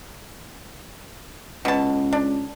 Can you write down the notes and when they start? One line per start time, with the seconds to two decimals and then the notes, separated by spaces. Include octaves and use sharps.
1.65 C#2 B2 A5
2.13 D4